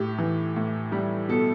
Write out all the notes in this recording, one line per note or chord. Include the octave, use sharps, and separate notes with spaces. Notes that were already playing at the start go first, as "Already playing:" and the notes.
Already playing: A2 G4
E3
A2
G3
B2 A4